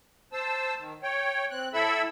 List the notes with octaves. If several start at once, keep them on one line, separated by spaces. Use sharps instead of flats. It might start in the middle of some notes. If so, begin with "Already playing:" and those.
C5 A5 E6
D#3
C#5 G5
C4 F#6
A2 E4 A4 E5 B5 E6